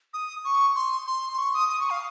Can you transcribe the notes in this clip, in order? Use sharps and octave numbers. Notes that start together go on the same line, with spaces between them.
D#6
C#6
C6
C6
C6
C#6
D#6
D#6
C#6
F5